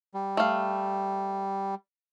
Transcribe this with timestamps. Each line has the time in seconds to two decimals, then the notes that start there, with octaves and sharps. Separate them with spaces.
0.14 G3
0.37 A3 F5